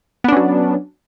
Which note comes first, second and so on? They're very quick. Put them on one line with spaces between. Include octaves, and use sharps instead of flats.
B3 D4 C#4 F#3